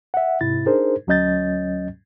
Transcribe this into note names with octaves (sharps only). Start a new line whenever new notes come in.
E5 F#5
G#2 C3 E4 A6
D4 D#4 G#4 A#4 C5
D2 F#3 C#4 D#5 G6 A6